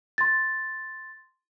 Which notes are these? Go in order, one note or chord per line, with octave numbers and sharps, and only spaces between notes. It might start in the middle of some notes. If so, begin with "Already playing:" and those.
C6 A6